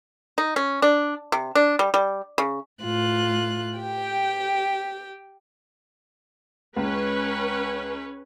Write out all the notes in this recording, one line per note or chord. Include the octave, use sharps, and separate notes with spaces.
D#4
C#4
D4
C3
D4
G3
G3
C#3
A2 F4 F#6
G4 G5
C#2 C#4 B4